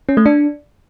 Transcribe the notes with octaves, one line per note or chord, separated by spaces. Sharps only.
C#4
A3
D4